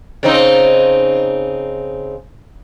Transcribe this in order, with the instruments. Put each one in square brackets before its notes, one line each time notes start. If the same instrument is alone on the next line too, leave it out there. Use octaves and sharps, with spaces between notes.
[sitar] C#3 C4 D#4